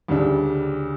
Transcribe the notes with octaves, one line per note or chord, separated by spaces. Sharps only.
D2 C#3 G3 D4